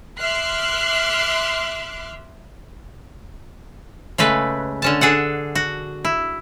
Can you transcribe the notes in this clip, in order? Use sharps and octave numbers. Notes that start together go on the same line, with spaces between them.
E5 C6 D6 F6 F#6 C7
C#3 G#3 A3 B4
D3 C#4 A5
D4 G#4 A4 F#5
F#4
E4